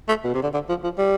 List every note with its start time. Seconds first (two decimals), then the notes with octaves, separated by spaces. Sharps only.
0.09 A3
0.24 B2
0.34 C3
0.43 D3
0.54 D3
0.69 F3
0.84 F3
0.98 G3